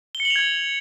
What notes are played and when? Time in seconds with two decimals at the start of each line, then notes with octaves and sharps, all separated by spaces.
0.15 G7
0.20 C#7
0.25 F#7
0.30 F7
0.36 G#6